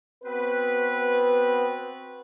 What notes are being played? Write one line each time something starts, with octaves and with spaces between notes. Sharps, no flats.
B3 C4 F#4 B4